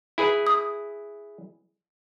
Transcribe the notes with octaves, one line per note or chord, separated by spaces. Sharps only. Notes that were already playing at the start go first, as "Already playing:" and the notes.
E4 G#4 B4
D#6